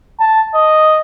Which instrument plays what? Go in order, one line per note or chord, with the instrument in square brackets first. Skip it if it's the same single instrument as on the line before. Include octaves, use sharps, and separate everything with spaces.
[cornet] A5
D#5